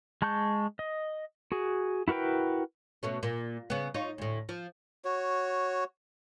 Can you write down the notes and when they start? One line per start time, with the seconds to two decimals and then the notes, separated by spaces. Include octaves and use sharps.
0.22 G#3 A5 C#6 G6
0.79 D#5
1.52 F#4 G#4
2.08 E4 F#4 A#4 B4 G5
3.03 B2 A3 C#4
3.23 A#2
3.70 C#3 B3
3.94 D#4 F4 C#5
4.18 D2 A2
4.49 F3
5.05 F#4 C#5